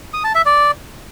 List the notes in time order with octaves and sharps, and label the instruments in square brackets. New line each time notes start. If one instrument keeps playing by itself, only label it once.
[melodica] D#6
A5
E5
D5